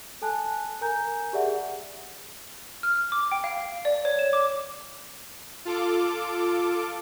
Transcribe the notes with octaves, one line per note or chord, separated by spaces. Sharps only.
A4 G#5 A5 F#6
A#4 G#5 A#5 G6
G4 G#4 D5 E5 F#5
F6
D6
G5
F5
D5
C#5
E7
D6
F4 A4 D6